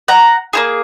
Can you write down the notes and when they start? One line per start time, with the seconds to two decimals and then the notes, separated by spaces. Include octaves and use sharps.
0.08 F#5 A#5
0.53 A#3 E4 G#4